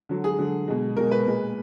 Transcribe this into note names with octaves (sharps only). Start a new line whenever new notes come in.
D3 F#3
G#4
D3 F#3
B2 G#3
B2 G#3 A#4
B4
A#2 G#3